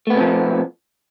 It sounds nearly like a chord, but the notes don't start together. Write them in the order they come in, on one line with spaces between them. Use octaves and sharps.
A3 B3 B2 C4 F3